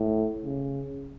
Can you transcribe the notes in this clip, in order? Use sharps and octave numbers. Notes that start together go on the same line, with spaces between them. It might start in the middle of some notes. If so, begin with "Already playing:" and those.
Already playing: A2
C#3